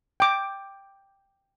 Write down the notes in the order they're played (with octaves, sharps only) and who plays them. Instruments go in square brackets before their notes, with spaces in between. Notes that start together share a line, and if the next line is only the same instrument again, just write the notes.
[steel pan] G5 D6